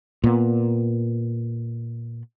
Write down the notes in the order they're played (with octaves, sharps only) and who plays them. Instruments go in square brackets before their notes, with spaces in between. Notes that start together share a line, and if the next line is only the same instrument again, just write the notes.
[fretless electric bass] A#2 B3